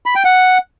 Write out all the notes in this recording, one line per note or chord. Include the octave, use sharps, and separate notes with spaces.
B5
G5
F#5